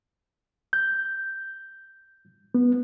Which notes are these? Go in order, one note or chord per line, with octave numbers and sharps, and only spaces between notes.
G6
B3